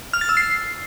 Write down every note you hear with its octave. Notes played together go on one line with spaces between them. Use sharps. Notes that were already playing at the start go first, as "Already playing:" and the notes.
F6
A6
E6
C7